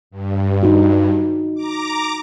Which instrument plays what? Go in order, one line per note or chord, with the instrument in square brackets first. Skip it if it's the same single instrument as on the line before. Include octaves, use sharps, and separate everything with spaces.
[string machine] G2
[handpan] D#4 F#4
[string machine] A#5 D6